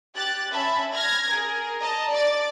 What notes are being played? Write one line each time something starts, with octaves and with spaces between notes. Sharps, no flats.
G4 F#6 A6
C#4 E5 A5 B5
F6 G#6 A#6
G#4 A#4
D#5 A5 A#5
D5 D6 A6